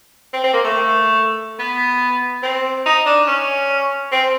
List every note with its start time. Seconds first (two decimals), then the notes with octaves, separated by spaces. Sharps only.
0.33 C4
0.44 C4
0.53 A#3
0.64 A3
1.59 B3
2.43 C4
2.86 D#4
3.06 D4
3.27 C#4
4.12 C4